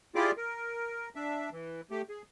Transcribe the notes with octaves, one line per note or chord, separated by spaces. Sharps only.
E4 F4 G4 G#4 D5 D6
A#4
D4 E5
E3
A3 G4
G#4